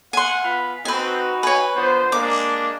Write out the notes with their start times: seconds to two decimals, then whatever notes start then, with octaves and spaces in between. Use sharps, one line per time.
0.13 F#5 G#5 C6
0.44 B3 F4 B5
0.85 C4 D#4 F#4 B4 G#5
1.43 B4 C#5 G#5
1.75 D3 F3 B3 C5
2.12 G#3 A#3 D4 D6